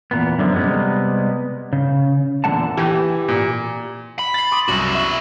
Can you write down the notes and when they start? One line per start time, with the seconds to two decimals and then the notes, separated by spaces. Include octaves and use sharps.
0.11 E2 A#2 B3
0.39 F#2 D3 F3
0.54 C3 G3 G#3 B3
1.73 C#3
2.44 E2 A#2 D3 G#3 F#5 A5
2.77 E3 G4
3.29 A#2
4.19 B5
4.34 A6 C7
4.52 C6 D6 D#6
4.68 C2 F#2 E4 F#4
4.95 E5 C#6